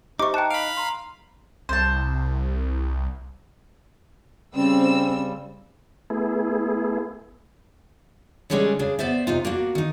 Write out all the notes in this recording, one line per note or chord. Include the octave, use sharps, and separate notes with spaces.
D#4 G4 C5 E5 C#6 D6
G5 A5 A#5 F#6 C#7
F5 B5 D7
A#5 C6
C2 C5 A5
C#3 G3 C4 C#4 E6
A3 B3 E4 G#4
C#3 G3 G#3 C#4 D4 A4
C#3 D4 G#4
B3 C5 D5 E5
C3 D#4 F4
A#3 D4 F#4
D#3 D#4